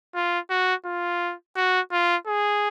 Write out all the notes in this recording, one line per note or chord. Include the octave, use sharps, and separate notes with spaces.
F4
F#4
F4
F#4
F4
G#4